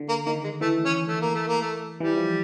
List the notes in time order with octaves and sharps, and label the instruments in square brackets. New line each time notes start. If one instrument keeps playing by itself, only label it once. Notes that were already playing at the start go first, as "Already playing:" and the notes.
Already playing: [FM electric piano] D3
[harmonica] A#3
[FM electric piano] D#3 [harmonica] A#3
[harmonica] G#3
[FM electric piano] E3 [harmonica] A3
[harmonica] C#4
A3
A#3
A3
A#3
A3
[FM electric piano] E3 [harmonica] G3
[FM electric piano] F3